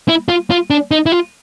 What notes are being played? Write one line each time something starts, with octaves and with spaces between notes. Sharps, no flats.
E4
F4
F4
D4
D#4
E4
F4